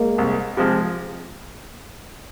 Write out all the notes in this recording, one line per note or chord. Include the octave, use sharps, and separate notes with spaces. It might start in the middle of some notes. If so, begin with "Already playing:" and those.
Already playing: G#3 A#3
C2
C3 F3 G#3